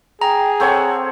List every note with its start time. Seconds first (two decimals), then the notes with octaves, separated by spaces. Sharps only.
0.21 G#4 G5 A#5
0.60 C4 A4 C#5 F#5